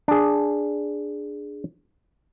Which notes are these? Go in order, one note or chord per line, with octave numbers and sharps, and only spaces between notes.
D4 G#4